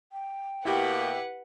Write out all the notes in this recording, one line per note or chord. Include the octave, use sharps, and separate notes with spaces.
G5
B2 A#3 E4 G4 B4 F#5